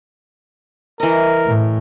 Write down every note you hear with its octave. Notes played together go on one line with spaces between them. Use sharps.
E3 A#4 D#5
A2